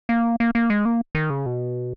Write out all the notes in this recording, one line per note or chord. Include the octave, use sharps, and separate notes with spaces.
A#3
A#3
A#3
G#3
A#3
D#3
C#3
B2